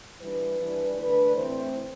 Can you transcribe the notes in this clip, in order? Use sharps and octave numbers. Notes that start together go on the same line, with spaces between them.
E3 G3 D4 B4
E3 G3 D4
D3 A3 D4 B4
A2 E3 A3 C4 C5